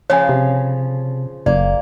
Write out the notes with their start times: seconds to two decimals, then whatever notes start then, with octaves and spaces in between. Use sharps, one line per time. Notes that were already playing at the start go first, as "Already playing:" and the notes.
0.10 C#3 F3 C#5 G#5
0.29 C3
1.46 F#1 A#3 D5